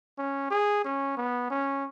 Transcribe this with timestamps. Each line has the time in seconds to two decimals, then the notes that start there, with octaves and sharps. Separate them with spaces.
0.19 C#4
0.51 G#4
0.85 C#4
1.17 B3
1.50 C#4